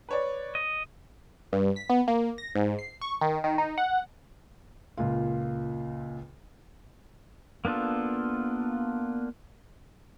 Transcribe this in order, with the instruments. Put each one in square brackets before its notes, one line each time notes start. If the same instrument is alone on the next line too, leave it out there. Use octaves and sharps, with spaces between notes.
[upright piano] B4 C#5 D5
[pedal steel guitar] D#5
[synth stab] G2
B6
B3
A#3
A#6
G#2
C7
C#6
D#3
D#3
D#4
F#5
[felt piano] C#2 A#2 F4
[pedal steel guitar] A#3 B3 D4 F4 A4